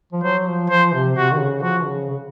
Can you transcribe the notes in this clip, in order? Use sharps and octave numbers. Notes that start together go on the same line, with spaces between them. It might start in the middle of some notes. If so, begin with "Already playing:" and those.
F3
F#3 C5
F3
F3 C5
C3
C3 F#4
D#3
C#3
F3 F#4
C#3
C#3